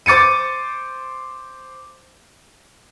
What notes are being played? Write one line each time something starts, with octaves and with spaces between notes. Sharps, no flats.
C5 D6 A6 C#7 D#7